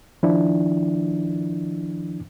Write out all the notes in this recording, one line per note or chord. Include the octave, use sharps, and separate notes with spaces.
D#3 F3 D4 E4